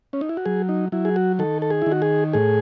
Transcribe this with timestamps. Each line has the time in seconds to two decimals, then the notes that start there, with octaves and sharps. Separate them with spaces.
0.13 C#4
0.21 D#4
0.29 E4
0.37 F#4
0.46 F#3 G#4
0.69 D#4
0.92 F#3 E4
1.05 G#4
1.16 F#4
1.39 D#3 A4
1.62 A4
1.70 G#4
1.82 D#3 E4
1.92 F#4
2.02 G#4
2.33 A2 G#4